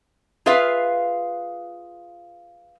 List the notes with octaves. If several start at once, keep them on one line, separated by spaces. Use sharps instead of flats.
F4 G#4 B4 E5 F5